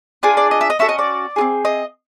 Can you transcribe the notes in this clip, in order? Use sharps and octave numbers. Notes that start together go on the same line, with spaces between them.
D4 F4 G#4 G#5
D5
D#5
E5
D#5
C#4 F#4 A4 E5
D#5
D5
C4 F4 G#4
D#5